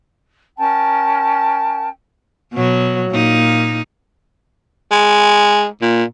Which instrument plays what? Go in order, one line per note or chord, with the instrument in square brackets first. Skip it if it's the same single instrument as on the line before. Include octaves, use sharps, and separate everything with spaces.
[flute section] C#4 A#4 G5 A5
[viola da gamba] B2 F#3
A#2 A#3 D#4
[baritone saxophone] G#3
A#2